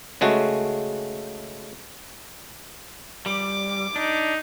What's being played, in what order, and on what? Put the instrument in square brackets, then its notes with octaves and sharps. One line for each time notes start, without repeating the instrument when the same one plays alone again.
[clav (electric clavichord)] C#3 G#3 A3 F#4
[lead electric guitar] G3 [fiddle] D6
[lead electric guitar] D4 [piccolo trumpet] D#4